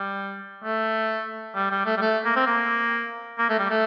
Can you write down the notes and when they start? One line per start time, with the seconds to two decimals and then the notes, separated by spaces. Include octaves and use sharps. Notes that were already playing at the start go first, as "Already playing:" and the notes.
Already playing: G3
0.64 A3
1.55 G3
1.71 G3
1.86 A3
1.97 G3
2.02 A3
2.25 A#3
2.36 C4
2.47 A#3
3.39 A#3
3.49 A3
3.59 G3
3.70 A3